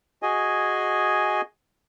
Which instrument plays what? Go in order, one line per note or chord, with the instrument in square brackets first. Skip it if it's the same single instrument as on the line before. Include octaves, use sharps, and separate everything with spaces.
[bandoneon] F#4 G#4 D#5 G#5